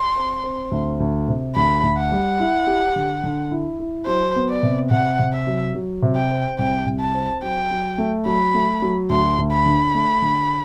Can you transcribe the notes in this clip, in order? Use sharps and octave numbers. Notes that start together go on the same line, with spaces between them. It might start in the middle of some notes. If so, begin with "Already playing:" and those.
Already playing: C6
C4
C4
D2
D2
C3
D2 B5
D2
F#5
G3
E4
G4
D3
D3
E4
E4
F#3 C5
B3
D5
C3
C3 F#5
C3
E5
F#3
F#3
C3
G5
C4
C2 G5
C2
A5
C4
F#3 G5
F#3
A3
F#3 B5
A3
F#3
D2 C6
D2
B5
D3
A3
D3